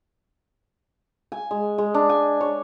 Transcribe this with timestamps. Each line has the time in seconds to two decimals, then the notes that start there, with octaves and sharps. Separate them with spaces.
1.32 G#5
1.51 G#3
1.78 G#3
1.94 D4
2.09 G#5
2.41 C#5